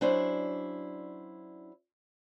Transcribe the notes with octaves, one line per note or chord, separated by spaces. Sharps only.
F#3 C#4 D4 E4 C5